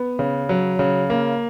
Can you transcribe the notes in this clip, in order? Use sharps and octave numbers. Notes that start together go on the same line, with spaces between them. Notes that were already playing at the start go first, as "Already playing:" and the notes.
Already playing: B3
C#3
F#3
C#3
A#3